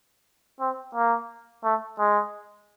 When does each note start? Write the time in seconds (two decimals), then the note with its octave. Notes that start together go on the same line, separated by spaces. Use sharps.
0.60 C4
0.95 A#3
1.64 A3
1.99 G#3